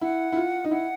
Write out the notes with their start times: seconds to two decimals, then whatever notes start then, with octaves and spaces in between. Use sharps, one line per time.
0.01 E4 F#5
0.32 E4
0.36 F4
0.64 D#4
0.71 E4 F#5